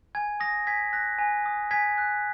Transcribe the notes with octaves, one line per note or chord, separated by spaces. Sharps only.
G#5 G#6
D#6 A#6
G#5 G#6 B6
F#6 A#6
G#5
D#6
G#5 G#6 B6
F#6